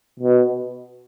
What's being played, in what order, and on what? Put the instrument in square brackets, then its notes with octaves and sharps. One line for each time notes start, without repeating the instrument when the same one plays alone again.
[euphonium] B2